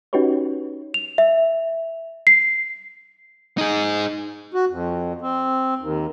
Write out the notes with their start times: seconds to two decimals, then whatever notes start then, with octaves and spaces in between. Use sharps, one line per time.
0.13 C#4 D#4 F#4 G4 B4 C#5
0.94 F7
1.18 E5
2.27 C7
3.58 D#4 G#4
4.54 F#4
4.69 F2
5.21 C4
5.78 D#2